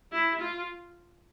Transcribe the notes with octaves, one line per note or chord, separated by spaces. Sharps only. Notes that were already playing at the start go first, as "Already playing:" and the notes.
E4
F4